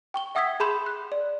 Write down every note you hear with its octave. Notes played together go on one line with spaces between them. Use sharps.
G5 C#6 G7
E5 F#5 D#6 E6 G#6 B6
G#4 A5 B5 C6 G6 E7
F#6
D5